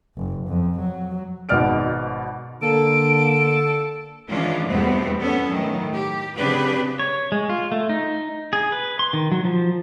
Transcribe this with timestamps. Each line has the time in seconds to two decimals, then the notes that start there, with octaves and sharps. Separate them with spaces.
0.17 F#1
0.48 F2
0.80 F#3
1.49 G#1 G#2 B2 D5 F6 D7
2.62 D3 A#3 A4 D7
4.28 D#3 E3 G#3 C#4 D4 F4
4.67 E2 G2 B2 A3 B3 C4
5.20 B3 C#4 A4
5.49 A2 D#3 F#3
5.93 G4
6.36 C#3 F#3 C4 D4 G4 B4
6.99 C#5
7.32 G#3
7.50 F4
7.72 A3
7.89 D#4
8.53 G#4
8.72 B4
8.99 C6
9.13 D#3
9.32 F#3
9.45 F3